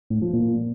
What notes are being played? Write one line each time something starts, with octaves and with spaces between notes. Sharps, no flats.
A2
F3
A#2